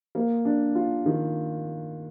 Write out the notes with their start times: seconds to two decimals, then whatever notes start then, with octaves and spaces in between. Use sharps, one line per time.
0.15 A#3
0.45 D4
0.75 F4
1.06 D#3